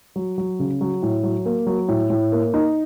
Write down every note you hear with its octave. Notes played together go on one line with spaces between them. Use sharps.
F#3
F#3
C#3
F#3
A2
F#3
A#3
F#3
A2
A2
A#3
D#4